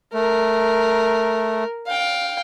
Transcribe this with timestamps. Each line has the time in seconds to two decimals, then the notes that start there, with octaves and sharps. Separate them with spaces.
0.14 A3 A#4
1.87 F5 G5